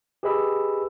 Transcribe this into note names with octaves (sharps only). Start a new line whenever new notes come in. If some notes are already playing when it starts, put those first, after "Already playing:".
G4 G#4 B4 D#5 B5 E6